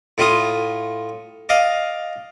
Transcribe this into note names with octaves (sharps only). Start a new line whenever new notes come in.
A2 E4 F4 D#6
D5 D#5 F5